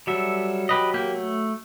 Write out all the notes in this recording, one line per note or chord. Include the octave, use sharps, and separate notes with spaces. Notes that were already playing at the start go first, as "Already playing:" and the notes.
F#3 G3 A4 E5
G4 B4 D#5
A#3 G4
A3